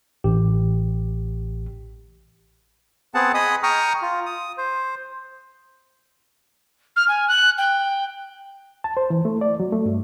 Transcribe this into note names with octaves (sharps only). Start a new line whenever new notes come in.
A1 G4
B3 C4 G#4 F#5 A5
G#4 D#5 B5 D#6
G5 A#5 C#6 D#6 F6
F4
D#6
C5
F6
G#5
F#6
G5
A5
C5
E3
A3
D5
F#3
A3
G2